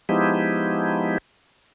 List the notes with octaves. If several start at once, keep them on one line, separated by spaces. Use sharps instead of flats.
F3 G#3 B3 D#4 E4 G4